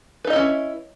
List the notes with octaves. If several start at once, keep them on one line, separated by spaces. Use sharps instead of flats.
C#4 D#4 E4 B4 D#5